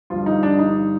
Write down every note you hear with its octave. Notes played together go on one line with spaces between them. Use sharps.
G1 G2 F3 F4
D#4
D4
D#4